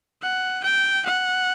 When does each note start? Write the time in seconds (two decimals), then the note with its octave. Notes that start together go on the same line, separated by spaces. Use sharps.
0.22 F#5
0.64 G5
1.06 F#5